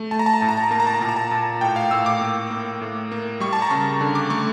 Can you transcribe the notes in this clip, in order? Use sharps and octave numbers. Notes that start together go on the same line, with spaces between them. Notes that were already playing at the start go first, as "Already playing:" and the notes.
Already playing: A3
A3 A5
A#5
A5
A#5
A2 A5
A#5
A5
A#5
A#3 A5
A#5
A5
A#5
A#2 A5
A#5
A5
A#2
A2 G5
F5
A2 E6
D6
A#3
A#3
A2
A#3
G3 C#6
A5
A#5
C#3 C#6
D3
D6
A3 C#6